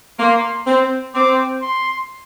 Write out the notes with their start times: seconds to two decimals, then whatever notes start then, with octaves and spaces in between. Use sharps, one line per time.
0.19 A#3 C6
0.67 C4
1.15 C4 D6
1.62 C6